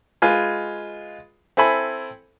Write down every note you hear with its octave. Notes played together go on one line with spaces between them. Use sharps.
G#3 F4 B4 G#5
C4 E4 A4 G#5 B5